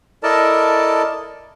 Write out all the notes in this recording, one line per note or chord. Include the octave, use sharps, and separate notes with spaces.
E4 A4 A#4 D5 D#5 A5